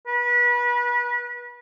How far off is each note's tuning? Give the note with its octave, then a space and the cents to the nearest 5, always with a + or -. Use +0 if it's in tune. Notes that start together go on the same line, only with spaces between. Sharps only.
B4 -30